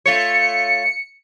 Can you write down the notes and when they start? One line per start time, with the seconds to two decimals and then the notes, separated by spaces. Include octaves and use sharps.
0.06 A3 F4 C#5 C#7